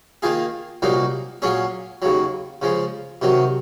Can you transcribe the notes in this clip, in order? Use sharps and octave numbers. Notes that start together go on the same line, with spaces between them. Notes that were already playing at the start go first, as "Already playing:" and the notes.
D#3 A#3 F4 G#4
C2 A#2 F#3 A#3 D#4
A#2 F#3 C#4 G#4
D#2 C#3 F#3
C#3 F3 G#3
C3 D#3 F#3